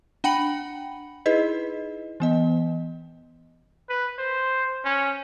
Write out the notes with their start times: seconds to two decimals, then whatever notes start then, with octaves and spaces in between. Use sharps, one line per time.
0.24 D4 F#5 G5 B5 C#7 F#7
1.26 D#4 E4 G#4 B4 D#5
2.20 E3 B3 D#5
3.90 B4
4.18 C5
4.85 C#4